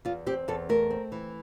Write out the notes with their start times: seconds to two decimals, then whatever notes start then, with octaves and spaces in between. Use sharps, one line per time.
0.05 E2 F4
0.26 C4 G4
0.48 E2 A4
0.69 A3 A#4
0.90 C4
1.12 E3